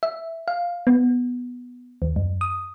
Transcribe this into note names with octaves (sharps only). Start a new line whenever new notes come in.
E5
F5
B3
D#2
F#2
D#6